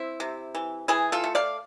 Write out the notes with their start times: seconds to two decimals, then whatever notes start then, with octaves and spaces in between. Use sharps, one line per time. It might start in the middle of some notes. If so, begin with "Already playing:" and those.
Already playing: C4 E4
0.20 C3
0.55 E3
0.88 E3 E4 G#4
1.12 F4 A4
1.24 A3
1.35 D5 F5